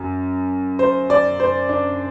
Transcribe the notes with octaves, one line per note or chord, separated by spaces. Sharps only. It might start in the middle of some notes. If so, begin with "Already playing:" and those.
Already playing: F#2
C5
D5
C5
D4